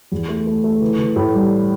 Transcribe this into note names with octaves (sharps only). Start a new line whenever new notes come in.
E2
A3
A3
A3
E3
E3
A2
G3